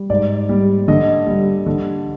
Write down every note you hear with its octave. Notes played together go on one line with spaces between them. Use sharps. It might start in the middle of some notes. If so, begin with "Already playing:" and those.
Already playing: G3
G#2 D5
G3
D3 D#5
G3
D3